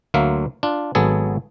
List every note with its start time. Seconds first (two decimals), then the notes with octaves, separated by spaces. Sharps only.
0.14 D2 F#3 A#3 E5 F5
0.63 D4 F4
0.95 G#1 F#3 B3 G#4 A4